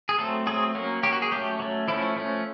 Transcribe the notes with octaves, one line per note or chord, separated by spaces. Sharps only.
G#4
F#3 A3 C4 A4
F#3 A3 C4 G#4
F#3 A#3 C#4
F#3 A#3 C#4 G4
F#4
G#4
F#3 A3 C#4 G4
F#3 A3 C#4
F3 A3 C#4 E4
F3 A3 C#4